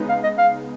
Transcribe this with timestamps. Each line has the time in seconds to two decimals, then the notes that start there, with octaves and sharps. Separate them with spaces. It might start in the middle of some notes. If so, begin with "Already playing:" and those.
Already playing: C#3 G#3 B3 D#4
0.09 F5
0.23 D#5
0.38 F5